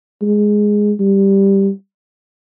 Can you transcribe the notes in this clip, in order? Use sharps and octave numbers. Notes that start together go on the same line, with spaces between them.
G#3
G3